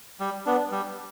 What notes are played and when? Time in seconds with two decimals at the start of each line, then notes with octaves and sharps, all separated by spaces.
0.20 G3
0.46 B3 D4
0.71 G3